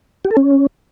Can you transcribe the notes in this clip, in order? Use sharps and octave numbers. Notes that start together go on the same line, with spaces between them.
G4
A4
C#4